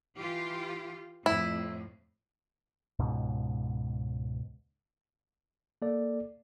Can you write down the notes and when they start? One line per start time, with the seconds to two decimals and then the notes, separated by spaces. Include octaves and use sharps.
0.17 E3 F4 G4
1.26 F2 A2 E4
2.99 C#2 G#2 B2
5.82 A#3 A4 D5